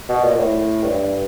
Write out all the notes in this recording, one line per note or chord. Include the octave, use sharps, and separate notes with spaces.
B2
A#2
A#2
A2
G2